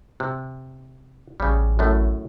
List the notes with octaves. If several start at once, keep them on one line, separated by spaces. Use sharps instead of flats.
C3
A1 C#3 G3
F#2 A2 A3